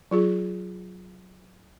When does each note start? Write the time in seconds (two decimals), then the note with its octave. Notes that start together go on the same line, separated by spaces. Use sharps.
0.11 F#3 F4 G#4